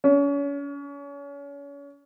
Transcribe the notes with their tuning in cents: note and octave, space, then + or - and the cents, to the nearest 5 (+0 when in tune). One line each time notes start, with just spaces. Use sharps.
C#4 +35